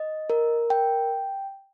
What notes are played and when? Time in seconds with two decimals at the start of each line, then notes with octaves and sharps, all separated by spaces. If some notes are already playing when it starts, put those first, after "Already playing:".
Already playing: D#5
0.30 A#4
0.70 G5